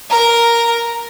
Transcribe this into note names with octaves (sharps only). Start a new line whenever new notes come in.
A#4 A#5